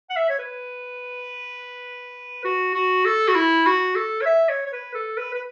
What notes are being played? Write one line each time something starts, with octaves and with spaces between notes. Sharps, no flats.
F#5
E5
C#5
B4
F#4
F#4
A4
F#4
E4
F#4
A4
C#5
E5
C#5
C#5
B4
A4
B4
B4